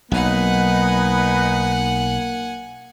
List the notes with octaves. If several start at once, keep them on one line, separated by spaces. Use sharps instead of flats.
B1 A#3 D#4 B4 F#5 G#5